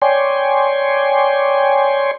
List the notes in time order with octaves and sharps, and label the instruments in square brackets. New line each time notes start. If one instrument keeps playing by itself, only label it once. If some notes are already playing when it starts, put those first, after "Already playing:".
[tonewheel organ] C#5 D5 G5 G#5 C6